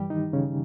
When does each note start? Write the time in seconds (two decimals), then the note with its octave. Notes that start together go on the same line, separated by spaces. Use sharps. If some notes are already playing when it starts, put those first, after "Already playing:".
Already playing: G2 E3 G3 G4
0.10 D#3 D#4
0.33 C#3 C#4